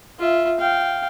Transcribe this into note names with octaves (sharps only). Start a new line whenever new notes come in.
F4 E5
F5 G5